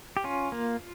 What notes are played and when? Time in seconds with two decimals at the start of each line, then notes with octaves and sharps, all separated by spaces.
0.17 G4
0.24 C#4 F4
0.52 A#3